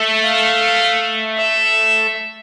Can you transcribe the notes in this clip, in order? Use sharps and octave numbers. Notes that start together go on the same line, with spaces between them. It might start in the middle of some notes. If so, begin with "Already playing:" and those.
Already playing: A3
F5
E5